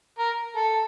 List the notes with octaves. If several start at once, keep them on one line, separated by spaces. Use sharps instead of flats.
A#4
A4